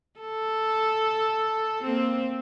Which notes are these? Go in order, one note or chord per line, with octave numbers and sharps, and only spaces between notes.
A4
A#3 C4